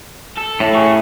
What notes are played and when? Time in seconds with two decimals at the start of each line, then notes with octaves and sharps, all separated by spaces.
0.38 A4
0.60 A2
0.75 G#4 C#5